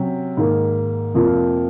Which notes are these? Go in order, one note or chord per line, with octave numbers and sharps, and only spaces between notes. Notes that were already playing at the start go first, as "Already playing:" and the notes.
Already playing: C3 F#3 C#4
G#2 D#3 A#3
F2 C3 F3 A#3 F4